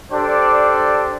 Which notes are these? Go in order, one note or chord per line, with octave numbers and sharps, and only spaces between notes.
D4 G4 A4 C5 D5